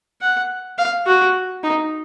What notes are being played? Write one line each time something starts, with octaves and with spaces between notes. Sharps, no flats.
F#5
F5
F#4
D#4